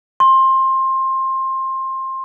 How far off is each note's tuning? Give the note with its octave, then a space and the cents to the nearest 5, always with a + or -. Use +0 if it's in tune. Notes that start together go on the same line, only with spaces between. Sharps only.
C6 +20